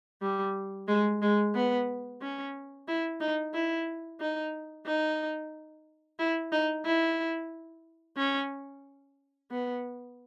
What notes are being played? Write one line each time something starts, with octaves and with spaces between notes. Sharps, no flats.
G3
G#3
G#3
B3
C#4
E4
D#4
E4
D#4
D#4
E4
D#4
E4
C#4
B3